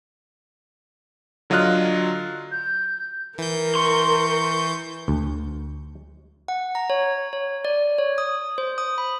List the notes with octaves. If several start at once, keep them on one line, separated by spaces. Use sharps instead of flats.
D3 F#3 F4 D#5 F6 F#6
G6
E3 A#4 G6
C6 C#6
D2
F#5
A#5
C#5
C#5
D5
C#5
D#6
C5
D#6
B5